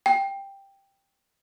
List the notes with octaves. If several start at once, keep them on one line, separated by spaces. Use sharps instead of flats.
G5